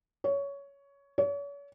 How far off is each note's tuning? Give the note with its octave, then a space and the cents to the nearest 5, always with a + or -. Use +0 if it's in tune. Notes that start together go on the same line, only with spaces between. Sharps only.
C#5 +15
C#5 +40